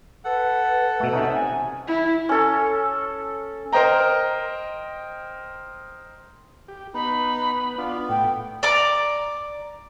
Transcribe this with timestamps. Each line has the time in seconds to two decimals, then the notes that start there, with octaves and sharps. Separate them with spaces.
0.25 A4 B4 F#5
1.00 B2 A3
1.13 C3 C#4 D#4 E5
1.34 G#5
1.88 E4
2.29 C#4 A4
3.73 A#4 C5 D#5 G5 A#5
6.68 G4
6.94 B3 D#4 B5
7.78 B3 D4 F4
8.09 A2 G5
8.63 D5 A#5 D6